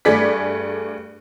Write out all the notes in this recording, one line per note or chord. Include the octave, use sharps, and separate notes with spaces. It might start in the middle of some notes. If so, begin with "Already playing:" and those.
G2 A3 G#4 D5 B6